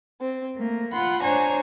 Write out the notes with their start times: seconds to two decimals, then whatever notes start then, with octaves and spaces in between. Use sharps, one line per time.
0.19 C4
0.55 A3 A#3
0.92 F4 F#5 B5 C6
1.22 D4 C5 C#5 G#5 A#5